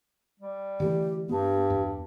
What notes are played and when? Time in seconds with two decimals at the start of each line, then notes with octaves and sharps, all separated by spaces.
0.40 G3
0.80 D3 E3 A3 G4
1.29 G2 B3 G4
1.70 E2